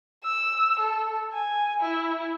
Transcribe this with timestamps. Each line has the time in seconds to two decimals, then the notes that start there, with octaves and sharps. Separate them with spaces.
0.24 E6
0.79 A4
1.33 G#5
1.80 E4